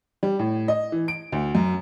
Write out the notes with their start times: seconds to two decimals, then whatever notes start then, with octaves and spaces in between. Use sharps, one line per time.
0.23 G3
0.39 A2
0.68 D#5
0.92 E3
1.08 D7
1.32 D2
1.55 F#2